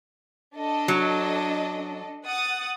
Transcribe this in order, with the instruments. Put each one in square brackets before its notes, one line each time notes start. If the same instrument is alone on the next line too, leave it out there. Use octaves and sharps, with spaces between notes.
[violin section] D4 A4 D#5
[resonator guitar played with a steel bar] F#3
[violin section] F#5 D#6 A6